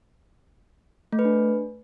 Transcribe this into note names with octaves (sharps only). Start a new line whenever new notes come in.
A3
B4
D4